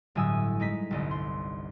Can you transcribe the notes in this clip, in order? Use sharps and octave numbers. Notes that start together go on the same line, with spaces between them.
G1 A2 F#3 G#5 D#6 E6
G#3 D#4 B6
G1 C2 D#5
C6